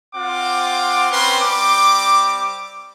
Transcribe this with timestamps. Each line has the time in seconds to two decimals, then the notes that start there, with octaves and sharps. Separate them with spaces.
0.13 C4 F4 F#5 D6
1.10 C4 C#4 B4 C6
1.41 G3 C4 D6